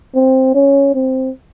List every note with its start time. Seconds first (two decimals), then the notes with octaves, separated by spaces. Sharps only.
0.15 C4
0.55 C#4
0.95 C4